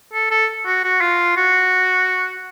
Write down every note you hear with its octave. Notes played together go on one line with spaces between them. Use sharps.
A4
A4
F#4
F#4
F4
F#4